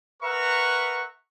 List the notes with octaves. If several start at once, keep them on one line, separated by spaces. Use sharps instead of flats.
A#4 B4 E5 F#5 A#5 C#6